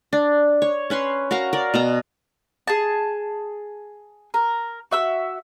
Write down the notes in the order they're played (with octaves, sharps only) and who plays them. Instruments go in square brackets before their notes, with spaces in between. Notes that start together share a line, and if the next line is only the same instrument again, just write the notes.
[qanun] D4
C#5
C#4 B4 C#5 C6
F#4 A#4 F5 A#5
A#4 D5
B2 B3 A#5
[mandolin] G#4 A5
A#4
F#4 E5 E6